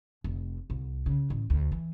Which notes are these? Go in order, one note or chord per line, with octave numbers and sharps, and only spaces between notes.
F1
C2
C#3
A1
D2
E3